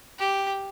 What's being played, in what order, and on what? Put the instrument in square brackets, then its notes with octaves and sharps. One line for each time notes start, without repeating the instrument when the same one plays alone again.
[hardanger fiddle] G4